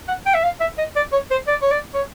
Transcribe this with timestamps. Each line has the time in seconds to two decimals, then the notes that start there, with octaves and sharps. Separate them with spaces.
0.08 F#5
0.26 G5
0.34 E5
0.43 F5
0.60 E5
0.78 D#5
0.96 D5
1.12 C#5
1.30 C5
1.47 D5
1.62 C#5
1.71 D5
1.94 C#5